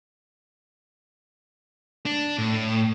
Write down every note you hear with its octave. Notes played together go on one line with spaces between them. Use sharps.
D4
A2